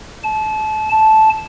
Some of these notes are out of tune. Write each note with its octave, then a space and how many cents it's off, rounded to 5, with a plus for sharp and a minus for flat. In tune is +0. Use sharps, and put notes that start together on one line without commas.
A5 -30
A5 -10